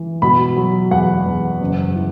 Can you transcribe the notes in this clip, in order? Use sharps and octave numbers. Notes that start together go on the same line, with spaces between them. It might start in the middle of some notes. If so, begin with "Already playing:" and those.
Already playing: E3
B2 B5
F#3
E2 F#5
E2
F#1
E3